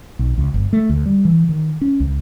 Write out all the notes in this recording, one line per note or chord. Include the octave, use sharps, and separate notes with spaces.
B1
C#2
G1
A3
D2
G3
E3
D#3
C#4
C#2